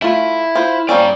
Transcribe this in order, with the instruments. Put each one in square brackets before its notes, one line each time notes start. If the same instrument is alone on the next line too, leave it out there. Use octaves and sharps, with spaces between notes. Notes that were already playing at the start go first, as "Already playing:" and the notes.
[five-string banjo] A3 F4 [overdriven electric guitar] E4
[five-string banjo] F4 C5
[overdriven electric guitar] G2 D5 [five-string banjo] A#3 C4 C#4